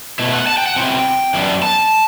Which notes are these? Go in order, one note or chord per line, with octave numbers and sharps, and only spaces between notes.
B2 A3 E4
F#5
A5
G5
F#5
C3 F#3 C4 E4 G5
F#2 E3 G3 B3 D4
A5